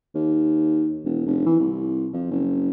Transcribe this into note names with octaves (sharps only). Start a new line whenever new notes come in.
D#2
E1
F1
E3
C2
F2
F#1